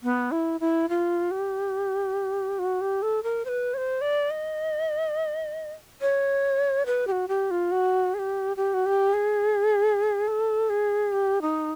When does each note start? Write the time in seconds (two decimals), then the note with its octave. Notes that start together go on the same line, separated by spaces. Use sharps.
0.03 B3
0.31 E4
0.60 E4
0.89 F4
1.31 G4
2.59 F#4
2.81 G4
3.02 A4
3.23 A#4
3.45 C5
3.49 B4
3.74 C#5
3.77 C5
4.01 D5
4.31 D#5
6.01 C#5
6.86 B4
7.07 G4
7.12 F#4
7.28 G4
7.51 F4
7.71 F#4
8.14 G#4
8.19 G4
8.56 G4
8.74 F#4
8.86 G4
9.14 G#4
10.28 A4
10.69 G#4
11.12 G4
11.42 D#4